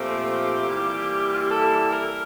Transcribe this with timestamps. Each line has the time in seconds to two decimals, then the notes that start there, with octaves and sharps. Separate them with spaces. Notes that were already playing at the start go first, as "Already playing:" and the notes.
Already playing: A#2 F3 A3 C4 G4
0.65 E3 G3 A#3 E4
1.33 F4
1.41 G4
1.50 A4
1.92 A#4